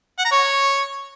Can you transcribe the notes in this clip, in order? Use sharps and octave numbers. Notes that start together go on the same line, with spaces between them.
F#5
A#5
C#5